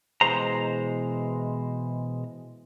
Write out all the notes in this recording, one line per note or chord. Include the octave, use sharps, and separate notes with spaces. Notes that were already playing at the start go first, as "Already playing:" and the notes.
B2 E3 G#3 C5 A#5